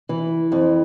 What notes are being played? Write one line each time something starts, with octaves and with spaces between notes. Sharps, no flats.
E3
F2